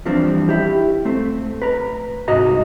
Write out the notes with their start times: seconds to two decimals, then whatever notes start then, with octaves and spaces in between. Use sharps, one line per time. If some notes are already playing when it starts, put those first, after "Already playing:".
0.05 E3 F3 G3 C4 D4
0.49 E4 G4
1.05 A3 C4
1.62 B4 A#5
2.28 C2 G#2 F#4 D#5 A#5